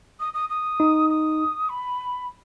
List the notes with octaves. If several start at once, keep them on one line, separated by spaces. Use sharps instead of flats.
D#6
D#6
D#6
D#4
D#6
B5